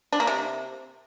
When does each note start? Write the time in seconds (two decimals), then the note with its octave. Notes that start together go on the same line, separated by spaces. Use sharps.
0.13 D4
0.20 A#3
0.27 C3